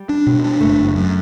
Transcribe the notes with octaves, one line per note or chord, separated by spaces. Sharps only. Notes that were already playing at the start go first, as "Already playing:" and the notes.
Already playing: G3
D4
B2
D4
F#1 A3
F#1
F#2